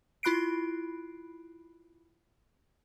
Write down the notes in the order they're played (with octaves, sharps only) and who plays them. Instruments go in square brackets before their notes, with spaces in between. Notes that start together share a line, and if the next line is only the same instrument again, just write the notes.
[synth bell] E4 F4 B5 F#6 C7 D7